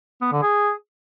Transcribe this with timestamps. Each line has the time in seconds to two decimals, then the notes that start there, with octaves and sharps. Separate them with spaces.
0.21 B3
0.32 D3
0.42 G#4